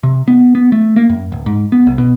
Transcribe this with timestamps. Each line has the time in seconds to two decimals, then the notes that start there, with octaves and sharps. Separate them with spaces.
0.03 C3
0.28 B3
0.55 B3
0.72 A3
0.96 A#3
1.09 F#2
1.32 D1
1.46 G#2
1.72 B3
1.87 C2
1.98 B2